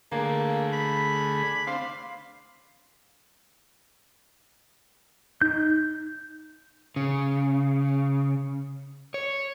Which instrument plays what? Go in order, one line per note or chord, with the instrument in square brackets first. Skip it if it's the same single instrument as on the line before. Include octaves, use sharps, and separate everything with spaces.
[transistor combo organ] D3 A3 G#4 [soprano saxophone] A#3
[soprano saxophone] B5
[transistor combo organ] C4 D4 C5 [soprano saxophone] F5
[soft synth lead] D#4 [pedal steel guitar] G6
[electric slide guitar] C#3
C#5